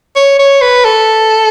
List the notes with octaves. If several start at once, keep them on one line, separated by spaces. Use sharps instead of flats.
C#5
C#5
B4
A4